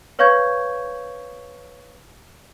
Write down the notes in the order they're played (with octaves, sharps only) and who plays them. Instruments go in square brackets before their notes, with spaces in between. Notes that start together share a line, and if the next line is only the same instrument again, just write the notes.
[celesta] B4 C#5 F5 C#6 G6 G#6